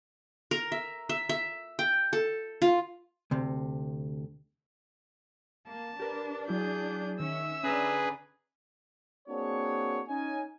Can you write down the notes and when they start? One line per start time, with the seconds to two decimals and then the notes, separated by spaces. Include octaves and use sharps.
0.51 A#4
0.72 E5
1.09 E5
1.29 E5
1.79 G5
2.13 A4
2.62 F4
3.31 D2 C3
5.68 A#3 A5
5.99 D4 G4 A#4 B4
6.48 F#3 E4 G#4 G6
7.20 D#3 C#4 E5 E6
7.63 D3 C#4 D4 G#4 B4 A#5 B5
9.28 A#3 C4 D4 F#4 G#4 C#5
10.08 C#4 D#4 G#5